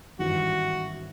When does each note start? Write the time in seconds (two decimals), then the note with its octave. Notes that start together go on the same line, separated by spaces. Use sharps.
0.19 G#1 G2 E3 F#4